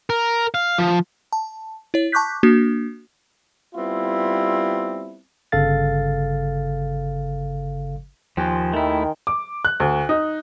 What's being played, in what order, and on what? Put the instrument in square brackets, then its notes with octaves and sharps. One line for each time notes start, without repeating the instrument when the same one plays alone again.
[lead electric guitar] A#4
F5
F3
[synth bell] A5
E4 C#5
A5 C#6 D6 F#6 G6 B6
A#3 D4 F#4
[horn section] G3 B3 C4 E4 F4
[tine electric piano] G1 C#3 A4 F5 A6
[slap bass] D#2 [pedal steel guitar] F3 [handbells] G5 G#5 C6
[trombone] D#3 [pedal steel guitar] A3 E4
[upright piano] D6
F#6
D2
D#4